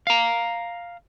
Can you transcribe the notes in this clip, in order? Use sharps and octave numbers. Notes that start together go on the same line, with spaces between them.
F5 A#5